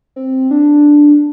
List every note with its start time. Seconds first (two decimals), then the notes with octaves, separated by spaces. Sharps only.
0.16 C4
0.51 D4